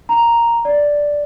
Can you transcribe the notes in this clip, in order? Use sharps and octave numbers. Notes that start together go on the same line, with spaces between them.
A#5
D5